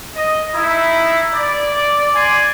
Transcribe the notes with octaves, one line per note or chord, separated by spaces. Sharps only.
D#5
D#4 E4
D5
D5 G#5 C6